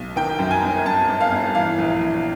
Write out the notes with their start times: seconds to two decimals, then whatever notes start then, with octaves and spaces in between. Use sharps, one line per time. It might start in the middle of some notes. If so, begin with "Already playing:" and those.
Already playing: B1
0.16 D#3 G5
0.39 F#2
0.51 G#5
0.62 G1
0.85 F#2 A5
1.08 G1
1.20 F5
1.32 G1
1.54 E3 F5
1.78 A#1
2.01 A#1